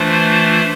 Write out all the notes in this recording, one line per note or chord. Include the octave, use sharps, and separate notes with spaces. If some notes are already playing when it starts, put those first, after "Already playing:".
Already playing: E3 A3 D4 F4 C5